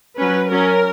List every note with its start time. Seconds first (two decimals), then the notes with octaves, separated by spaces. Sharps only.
0.18 F#3 C#4 B4
0.51 F#3 C#4 A#4